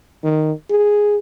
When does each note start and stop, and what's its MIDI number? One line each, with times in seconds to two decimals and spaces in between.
0.24 0.52 51
0.70 1.17 68